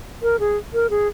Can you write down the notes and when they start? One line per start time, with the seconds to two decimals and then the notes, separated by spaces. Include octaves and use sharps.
0.22 A#4
0.39 G#4
0.74 A#4
0.90 G#4